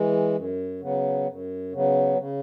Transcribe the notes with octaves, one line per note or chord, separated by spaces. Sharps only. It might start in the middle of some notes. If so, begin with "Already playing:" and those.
Already playing: E3 G#3
F#2
C#3 F#3 B3
F#2
C#3 F#3 B3
C#3